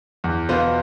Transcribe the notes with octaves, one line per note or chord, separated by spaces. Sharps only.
E2
B2 B3 F4 C5